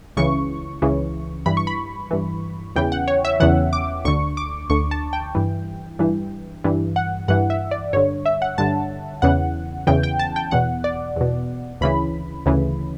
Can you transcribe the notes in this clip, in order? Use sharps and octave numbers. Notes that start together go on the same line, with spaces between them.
C#2 C#3 E3 C#6
C#2 C#3 E3
G2 E3 B5
C#6
B5
G2 E3
E2 C#3 E3 G5
F#5
C#5
E5
E2 C#3 E3 F#5
D6
D2 D3 C#6
D6
D2 D3 C#6
A5
G5
G2 E3
G2 E3
G2 E3
F#5
G2 E3 F#5
E5
D5
G2 D3 C#5
E5
F#5
G2 D3 A5
E2 C#3 E3 F#5
E2 C#3 E3 G5
G5
A5
G5
E2 B2 F#5
D5
E2 B2
D2 C#3 E3 B5
D2 C#3 E3